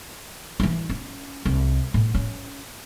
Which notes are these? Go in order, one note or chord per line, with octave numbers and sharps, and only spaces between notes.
E3 E4
C#4
C2
A2
C#4